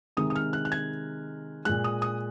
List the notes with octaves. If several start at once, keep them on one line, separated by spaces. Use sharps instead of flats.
C3 D#3 G#3 D#6
D#6
F6
F#6
F#6
G#6
A#2 G#3 F#6
D#6
D#6